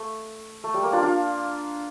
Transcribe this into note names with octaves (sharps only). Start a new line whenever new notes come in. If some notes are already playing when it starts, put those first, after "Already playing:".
Already playing: A3
A3
G3
A#3
D4 F4
D4 F4